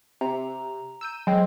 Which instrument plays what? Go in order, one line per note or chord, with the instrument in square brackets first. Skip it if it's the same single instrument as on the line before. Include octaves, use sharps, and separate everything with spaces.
[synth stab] C3 [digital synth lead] A#5
[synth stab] E6 G6 D#7
[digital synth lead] F#3 [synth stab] G#3 C4